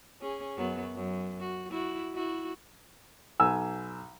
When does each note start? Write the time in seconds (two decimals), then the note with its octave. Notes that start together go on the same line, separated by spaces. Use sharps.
0.21 C#4 G#4
0.57 F#2 F#3 B3
0.95 F#2
1.40 F#4
1.71 E4 F#4
2.14 E4 F#4
3.40 B1 G#5 E6